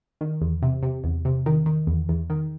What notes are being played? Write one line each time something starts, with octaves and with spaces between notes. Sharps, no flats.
D#3
E2
C3
C3
E2
C3
D#3
D#3
E2
E2
D#3